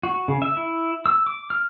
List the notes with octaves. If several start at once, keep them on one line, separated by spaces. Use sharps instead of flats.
F#4
C#3
E5
E4
E6
D6
F6